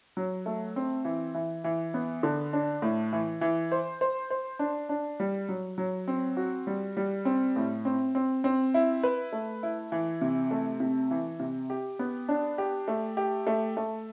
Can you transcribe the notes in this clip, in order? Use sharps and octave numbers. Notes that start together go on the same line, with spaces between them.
F#3
A3
C4
E3
E3
E3
B3
D3
D4
A2
E3
E3
C5
C5
C5
D4
D4
G3
F#3
F#3
C4
F#4
G3
G3
C4
A2
C4
C4
C4
E4
B4
A3
E4
E3
C3
A3
C3
E3
C3
G4
B3
D4
G4
A3
G4
A3
A3